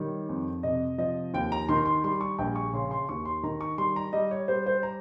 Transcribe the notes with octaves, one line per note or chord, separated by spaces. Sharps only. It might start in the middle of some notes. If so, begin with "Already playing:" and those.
Already playing: D#3 G3 C#5
F2
C3 D#5
F3 D#5
D#2 G5
A#5
D#3 C6
C6
G3 C6
C#6
A#1 G5
C#6
C#3 C6
C6
D#2 C#6
C6
D#3 A#5
C#6
G3 C6
A#5
G3 D#5
C#5
G3 C5
C5
A#5